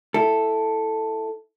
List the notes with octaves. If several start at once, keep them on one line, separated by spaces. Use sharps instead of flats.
E4 A4